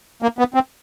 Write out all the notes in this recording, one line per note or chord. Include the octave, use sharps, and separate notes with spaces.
A#3
B3
C4